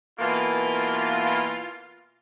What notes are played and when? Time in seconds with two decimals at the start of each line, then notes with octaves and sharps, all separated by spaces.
0.19 B2 E3 A#3 F4